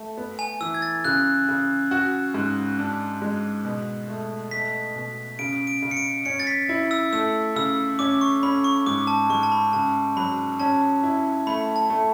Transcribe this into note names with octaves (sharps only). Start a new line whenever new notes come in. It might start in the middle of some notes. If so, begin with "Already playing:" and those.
Already playing: A3
B3
G#5
E3 E6
G#6
A6
C#3 F#6
C#3
F#4
G#2
D4
G#3
B2
A3
A3 B6
B2
C#3 D7
D7
C#3
C#7
D7
C#4 C#7
A6
B6
E4
E6
A3 E6
C#3 E6
C#4 D6
C#6
C#4 B5
C#6
G#2 D6
A5
G#2 C#6
A5
B5
C#3 A5
F#3 B5
C#4 A5
E4
A3 B5
A5
A3